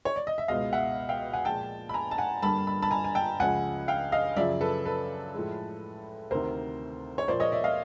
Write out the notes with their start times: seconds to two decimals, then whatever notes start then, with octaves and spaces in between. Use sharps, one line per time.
0.05 C#5
0.16 D5
0.27 D#5
0.38 E5
0.48 C#2 B2 G#3 D#5 F5
0.73 E5 F#5
1.09 F5 G5
1.33 F#5 G#5
1.45 A#2 F3 G#3 G5 A5
1.89 B5
1.94 G#5 A#5
2.11 A5
2.18 F#5 G#5
2.42 G2 D3 G3 A#3 A5 B5
2.67 B5
2.82 A5 B5
2.91 G#5 A#5
3.04 G#5
3.15 G5 A5
3.39 C#2 C#3 F3 F#5 G#5
3.88 F5 G5
4.12 D#5 F5
4.37 F#2 C#3 F3 D5 E5
4.61 A4 B4
4.85 A4 B4
5.34 A2 F3 G#3
6.31 D2 C3 D#3 A#4 C5
7.18 C#5
7.28 A#2 F3 A#3 C5 D5
7.40 C#5 D#5
7.52 D5 E5
7.64 D#5 F5